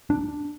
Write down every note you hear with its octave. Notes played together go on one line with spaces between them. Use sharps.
D4